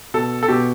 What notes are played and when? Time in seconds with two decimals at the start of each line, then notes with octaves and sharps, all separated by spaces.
0.14 B2 A4
0.43 A4
0.48 B2 G4